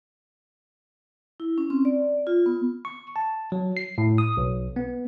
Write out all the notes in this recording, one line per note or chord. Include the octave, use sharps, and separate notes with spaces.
E4
C#4
C4
D5
F4
B3
C#6
A5
F#3
C7
A2
D#6
B1
B3